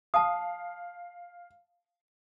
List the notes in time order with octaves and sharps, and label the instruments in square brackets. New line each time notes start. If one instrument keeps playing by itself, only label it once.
[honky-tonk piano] F5 [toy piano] A5 D#6